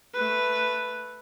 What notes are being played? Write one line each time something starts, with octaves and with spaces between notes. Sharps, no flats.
A3 B4